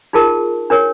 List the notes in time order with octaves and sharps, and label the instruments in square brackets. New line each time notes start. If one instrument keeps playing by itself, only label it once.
[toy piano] D#4 F4 G#4 A#4 A5
D4 A#4 C#5